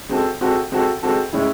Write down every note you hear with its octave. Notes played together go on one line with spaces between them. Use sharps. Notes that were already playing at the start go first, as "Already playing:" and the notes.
G#3 C4 F#4 A4
G#3 C4 F#4 A4
G#3 C4 F#4 A4
G#3 C4 F#4 A4
A2 G#3 C#4 E4